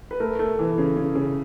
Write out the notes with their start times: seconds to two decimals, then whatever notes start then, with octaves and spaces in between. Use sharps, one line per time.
0.11 B4
0.20 A3 A#4
0.39 A3
0.59 E3
0.78 C#3
0.97 C#3
1.15 C#3